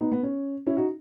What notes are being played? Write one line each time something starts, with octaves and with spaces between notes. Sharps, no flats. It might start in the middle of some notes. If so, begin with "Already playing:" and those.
B3 D#4
B3
C#4
C#4 E4
D#4 F#4